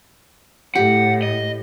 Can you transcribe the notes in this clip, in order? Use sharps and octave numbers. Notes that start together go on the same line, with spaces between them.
A2 G4 F#5
D#5